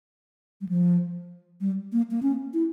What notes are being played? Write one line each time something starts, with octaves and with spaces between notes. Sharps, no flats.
G3
F3
G3
A#3
A#3
C#4
E4